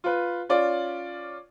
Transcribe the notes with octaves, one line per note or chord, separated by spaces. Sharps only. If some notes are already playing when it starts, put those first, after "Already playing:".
F4 B4
C#4 F4 D5